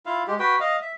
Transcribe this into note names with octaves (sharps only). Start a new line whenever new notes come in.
E4 F4 F5
G#3 G4
F#4 B4 G5
D#5 F5
E5